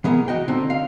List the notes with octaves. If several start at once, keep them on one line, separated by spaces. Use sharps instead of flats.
E3 B3 G#4 A#4
F#4 D#5 G5
D3 C4 D4 D#4
F5